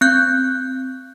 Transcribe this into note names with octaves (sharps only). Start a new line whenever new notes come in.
C4 F#6 G6